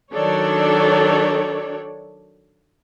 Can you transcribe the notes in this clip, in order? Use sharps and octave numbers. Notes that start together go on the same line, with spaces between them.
D#3 F#3 D4 A4 C#5 D5